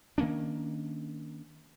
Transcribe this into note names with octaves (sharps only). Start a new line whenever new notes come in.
D#3 A#3 C#4 D4